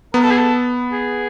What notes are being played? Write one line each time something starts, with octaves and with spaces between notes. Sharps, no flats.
B3 A#4
A4
G#4
A4
G#4